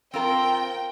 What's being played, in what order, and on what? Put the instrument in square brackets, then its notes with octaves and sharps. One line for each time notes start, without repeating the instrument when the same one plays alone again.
[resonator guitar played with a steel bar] C4 F4 A#4 [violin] G5